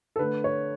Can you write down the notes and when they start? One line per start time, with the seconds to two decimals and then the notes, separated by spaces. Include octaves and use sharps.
0.16 A4
0.19 D3 A3 B4
0.44 C#5